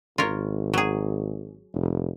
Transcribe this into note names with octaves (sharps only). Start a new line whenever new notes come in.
G#1 F4 A#4 C#5
F#3 G#4
F1